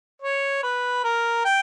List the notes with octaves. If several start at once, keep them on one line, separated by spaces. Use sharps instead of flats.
C#5
B4
A#4
G5